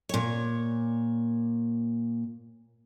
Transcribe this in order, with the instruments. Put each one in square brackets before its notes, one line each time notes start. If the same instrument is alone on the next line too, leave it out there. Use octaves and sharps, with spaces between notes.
[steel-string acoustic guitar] A#2 C#5